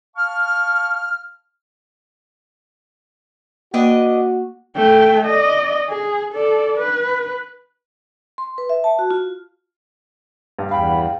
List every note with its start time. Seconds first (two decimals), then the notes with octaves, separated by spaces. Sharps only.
0.16 F5 A5 C#6 F6
3.74 A#3 D4 F#4 B4 D#5
4.76 A3 G5
5.26 D5 D#5
5.90 G#4
6.33 A4 D5
6.78 B4
8.38 C6
8.58 B4
8.69 E5
8.84 A5
8.99 F#4
9.11 F4
10.58 G2
10.71 E2 F5 G5 B5